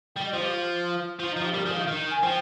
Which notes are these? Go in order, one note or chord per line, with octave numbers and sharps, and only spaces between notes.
G3 G5
D#5
F3 C5
G4
F4
F3 F4
D#4
F3
G4
G3 A#4
G#4
F3
F5
D#3 D#5
D#3
G#5
F3 G5